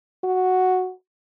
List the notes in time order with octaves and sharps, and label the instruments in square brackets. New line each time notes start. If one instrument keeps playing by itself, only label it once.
[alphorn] F#4